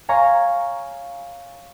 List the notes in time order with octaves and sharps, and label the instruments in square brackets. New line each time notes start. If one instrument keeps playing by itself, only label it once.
[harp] C#5 F5 G#5 A#5 C#6